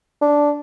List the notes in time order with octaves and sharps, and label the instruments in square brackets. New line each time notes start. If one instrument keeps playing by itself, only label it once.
[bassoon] D4